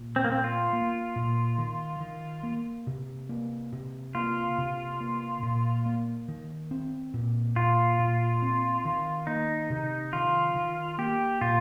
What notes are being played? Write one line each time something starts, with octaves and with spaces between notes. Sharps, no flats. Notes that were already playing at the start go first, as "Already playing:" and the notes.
Already playing: A#2
C4
A#3
A#2 C4
F4
A#3
A#2
D#3
D#3
A#3
C3
A#3
C3
A#3 F4
C3
A#3
A#2
A#3
D#3
C4
A#2
A#2 F4
A#2
C4
D#3
A#3 D#4
C3
D#3 F4
D#3
A#3 G4
A#2 F4